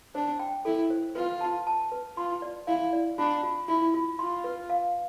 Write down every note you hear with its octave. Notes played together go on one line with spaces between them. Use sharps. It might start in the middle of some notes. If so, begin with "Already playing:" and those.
D4 C5
G5
E4 A4
C5
F4 B4
A5
A5
B4
F4 C6
D5
E4 F5
D5
D4 F4
F4
E4 F4
F4
F4 C6
B4
F5